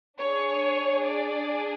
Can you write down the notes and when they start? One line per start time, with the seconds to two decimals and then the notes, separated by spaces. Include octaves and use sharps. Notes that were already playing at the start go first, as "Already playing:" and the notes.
0.20 D4 G#4 C#5
1.06 D5